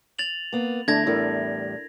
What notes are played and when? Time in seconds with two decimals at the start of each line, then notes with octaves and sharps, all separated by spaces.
0.19 A6 F7 F#7
0.53 A#3 B3
0.88 D3 A3 D4 E4 G#6 A#6
1.06 E2 A2 G3 E4 A4 A#4